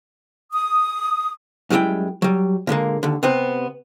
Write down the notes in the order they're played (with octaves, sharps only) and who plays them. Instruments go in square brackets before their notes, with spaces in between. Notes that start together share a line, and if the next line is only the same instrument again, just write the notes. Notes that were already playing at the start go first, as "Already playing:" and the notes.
[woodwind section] D#6
[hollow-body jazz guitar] F#2 F3 G3 G#3 E4 G5
F#3 G3
A#2 D3 G#3 A#3
D#2 D3
C3 B3 C4